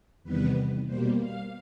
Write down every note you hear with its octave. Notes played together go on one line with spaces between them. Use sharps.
E2 C3 D#3 G3 B3 B4
B2 G3 A#3 C5
F5